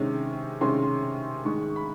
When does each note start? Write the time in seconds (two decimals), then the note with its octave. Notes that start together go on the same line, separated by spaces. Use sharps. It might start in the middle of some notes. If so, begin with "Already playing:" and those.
Already playing: C3 D#3 G#3 C#4
0.61 C3 D#3 G#3 C#4 C6
1.45 G#2 D#3 G#3 C#6
1.76 B5